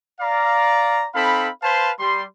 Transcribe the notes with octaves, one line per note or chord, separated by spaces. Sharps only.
D5 F5 A#5
C4 D#4 A4 F5 B5
B4 C5 F5 A5 B5 C6
G3 C6